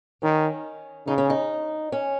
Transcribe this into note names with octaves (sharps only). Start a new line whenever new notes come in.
D#3 C#4
C#3 D#4
C#4
D#4
C#4